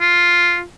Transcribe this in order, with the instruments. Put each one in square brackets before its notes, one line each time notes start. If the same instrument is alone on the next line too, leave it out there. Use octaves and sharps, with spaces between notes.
[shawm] F4